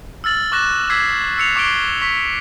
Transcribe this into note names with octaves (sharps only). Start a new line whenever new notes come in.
E6 F6 A6 F#7
C#6 D6 F#6 A#6 E7
D6 E6 G#6 B6 C7
E6 C7 C#7 F7
C#6 D6 C7 D7 G7
C#6 B6